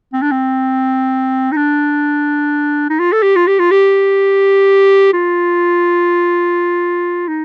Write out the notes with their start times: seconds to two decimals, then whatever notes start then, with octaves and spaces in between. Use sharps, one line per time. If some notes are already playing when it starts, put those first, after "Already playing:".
0.14 C4
0.22 D4
0.31 C4
1.52 D#4
1.57 D4
2.90 D#4
2.99 F4
3.12 A4
3.23 G4
3.36 F4
3.47 G4
3.59 F4
3.71 G4
5.13 F4
7.28 D#4